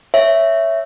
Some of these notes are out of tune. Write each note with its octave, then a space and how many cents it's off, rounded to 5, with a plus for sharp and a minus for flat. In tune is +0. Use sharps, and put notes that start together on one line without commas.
C#5 +0 E5 +0